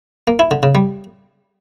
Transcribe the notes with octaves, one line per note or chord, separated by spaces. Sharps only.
A#3
E4
D3
C#3
G3